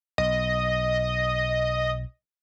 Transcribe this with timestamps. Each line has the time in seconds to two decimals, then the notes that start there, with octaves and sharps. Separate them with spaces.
0.18 B1 D#5